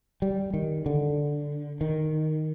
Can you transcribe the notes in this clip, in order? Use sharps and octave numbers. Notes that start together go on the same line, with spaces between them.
G3
D#3
D3
D#3